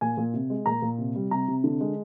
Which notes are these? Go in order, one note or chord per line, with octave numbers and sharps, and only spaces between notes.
A#2 G#5
A#2
C3
G#3
A#2 A#5
A#2
C3
G3
C3 A#5
C3
D3
G#3